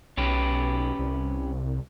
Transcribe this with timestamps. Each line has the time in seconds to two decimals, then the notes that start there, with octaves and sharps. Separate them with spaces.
0.17 B1 C#4 G4 B4
0.99 C2